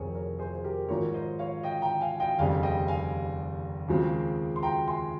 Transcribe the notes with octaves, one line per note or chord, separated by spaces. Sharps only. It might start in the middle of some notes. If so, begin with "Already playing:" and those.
Already playing: F1 F2 C3 D#3 G#4 A#4 C5 C#5
A#4 C#5
G#4 C5
C5
G4 A#4
G#1 G#2 F3 A#4 C#5
C5 D#5
C#5 F5
D#5 G5
G5 A#5
F5 G#5
D#5 G5
F1 D#2 C#3 G3 C4 F5 G#5
D#5 G5
F5 G#5
D#2 C#3 F3 G#3 C4
C6
G5 A#5
G#5 C6